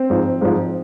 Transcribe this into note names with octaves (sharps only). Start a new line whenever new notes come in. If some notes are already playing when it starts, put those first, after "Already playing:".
Already playing: C4
G#2 F3
G#2 F3